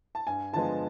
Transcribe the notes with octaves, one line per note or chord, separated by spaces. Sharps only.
A5
G2 G#5
D3 F3 G#3 B3 A5